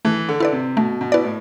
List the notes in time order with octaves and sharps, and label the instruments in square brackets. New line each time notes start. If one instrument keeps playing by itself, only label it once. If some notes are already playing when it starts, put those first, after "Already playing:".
[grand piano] E3 [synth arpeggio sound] A3
[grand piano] D3
[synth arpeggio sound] E4 B4 D5
[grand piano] C3
[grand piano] B2 [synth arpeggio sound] A3
[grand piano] B2
[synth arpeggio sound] E4 B4 D5
[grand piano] A2